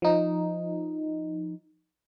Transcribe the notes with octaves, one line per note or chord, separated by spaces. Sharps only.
F3 D#4